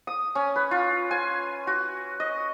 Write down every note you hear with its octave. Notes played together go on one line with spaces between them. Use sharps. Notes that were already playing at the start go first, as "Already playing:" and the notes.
D#6
C#4
B4
F4
G#5
F#4
D#5